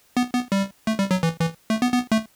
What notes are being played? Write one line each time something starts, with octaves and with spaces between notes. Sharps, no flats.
B3
B3
G3
A3
G3
F#3
E3
E3
A3
B3
B3
A3